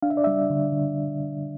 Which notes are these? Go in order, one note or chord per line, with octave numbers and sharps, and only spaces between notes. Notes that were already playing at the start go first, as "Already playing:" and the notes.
D4 F5
E5
D5
G3 E5
D3
D3